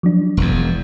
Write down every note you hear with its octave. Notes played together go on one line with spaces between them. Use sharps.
F3 F#3 D4
E1 E2